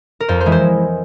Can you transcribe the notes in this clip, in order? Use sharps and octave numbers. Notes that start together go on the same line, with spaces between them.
A#4
F2 C5
C5
E3 G#3 E4
C5